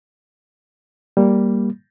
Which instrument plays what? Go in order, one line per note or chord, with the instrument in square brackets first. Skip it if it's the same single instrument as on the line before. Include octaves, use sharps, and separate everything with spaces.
[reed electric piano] G3 A#3